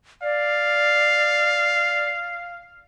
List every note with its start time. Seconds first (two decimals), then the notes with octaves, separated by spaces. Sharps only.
0.22 D5 F5